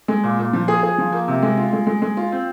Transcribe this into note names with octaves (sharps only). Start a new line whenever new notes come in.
G#3
A#2
A#2
F3
G#4
G#4
F3
A#3
C3
G#3
F4
G#3
G#3
G#3
F4
C4